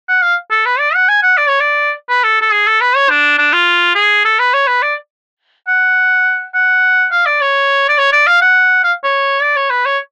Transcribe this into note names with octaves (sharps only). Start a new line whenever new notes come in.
F#5
F5
A4
B4
D5
F#5
G#5
F#5
D5
C#5
D5
B4
A4
A4
G#4
A4
B4
C#5
D4
D4
F4
G#4
A4
B4
C#5
B4
D5
F#5
F#5
F5
D5
C#5
D5
C#5
D5
F5
F#5
F5
C#5
D5
C#5
B4
C#5